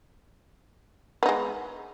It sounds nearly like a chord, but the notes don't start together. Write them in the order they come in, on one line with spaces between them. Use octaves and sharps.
B3 D#4 G#3